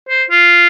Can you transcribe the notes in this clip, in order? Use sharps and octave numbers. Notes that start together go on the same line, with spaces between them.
C5
F4